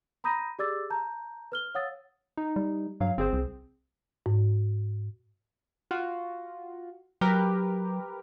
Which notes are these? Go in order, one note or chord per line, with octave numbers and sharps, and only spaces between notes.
A#5 B5 D#6 G6 A#6 D#7
G4 G#4 D5 D6 E6 A6
A5 A#5 G6
B4 F6 G7
C#5 F5 F#5 D#6 E6 A6
D#4
G3
G2 F#3 F5
G1 C4 G#4 C5
C2
G#2
F4 F#4
F#3 G4 A#4 B4